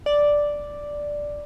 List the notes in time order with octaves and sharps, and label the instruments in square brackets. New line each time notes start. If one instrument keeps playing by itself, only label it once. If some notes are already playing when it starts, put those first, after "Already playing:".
[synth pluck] D5